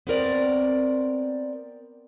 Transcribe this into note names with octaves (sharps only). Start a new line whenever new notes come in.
B3 C4 A#4 D5